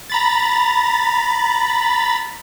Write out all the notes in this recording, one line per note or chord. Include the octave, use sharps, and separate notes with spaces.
A#5 B5 A6